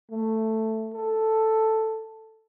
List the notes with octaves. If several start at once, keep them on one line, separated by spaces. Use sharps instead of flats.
A3
A4